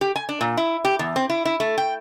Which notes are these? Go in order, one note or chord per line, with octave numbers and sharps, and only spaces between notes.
G4
G#5
D4
A#2
E4
G4
E2
C4
E4
E4
A3
G5